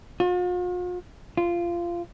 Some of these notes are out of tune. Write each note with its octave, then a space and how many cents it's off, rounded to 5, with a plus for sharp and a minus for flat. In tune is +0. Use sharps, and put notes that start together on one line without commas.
F4 +45
F4 -15